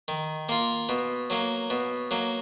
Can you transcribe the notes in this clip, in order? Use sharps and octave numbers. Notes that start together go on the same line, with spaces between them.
D#3
A#3 F4
B2
F#3 A#3
B2
F#3 A#3